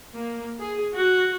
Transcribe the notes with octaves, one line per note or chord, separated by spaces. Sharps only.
A#3
G#4
F#4